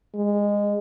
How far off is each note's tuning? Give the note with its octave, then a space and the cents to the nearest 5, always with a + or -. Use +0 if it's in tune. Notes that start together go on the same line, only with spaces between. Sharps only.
G#3 -20